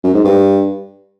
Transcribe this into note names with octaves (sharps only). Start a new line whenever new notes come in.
F#2
G#2
G2